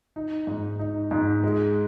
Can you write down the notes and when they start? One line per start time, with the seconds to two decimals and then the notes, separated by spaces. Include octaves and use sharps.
0.16 D#4
0.47 G#2
0.79 D#4
1.11 G#2
1.43 G#3